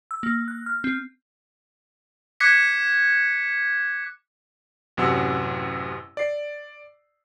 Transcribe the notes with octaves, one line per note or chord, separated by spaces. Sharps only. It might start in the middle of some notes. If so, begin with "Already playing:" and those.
E6
A#3
F#6
F6
C4
D6 F#6 G#6 B6 C#7
A1 F#2 C3 F#5 E6
D5 C7